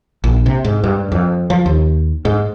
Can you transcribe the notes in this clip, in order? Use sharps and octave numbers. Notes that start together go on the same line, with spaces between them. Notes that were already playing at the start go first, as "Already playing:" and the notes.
A#1
C3
G#2
G2
F2
F3
D#2
G#2